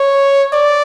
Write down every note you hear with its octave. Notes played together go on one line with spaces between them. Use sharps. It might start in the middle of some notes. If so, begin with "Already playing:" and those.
Already playing: C#5
D5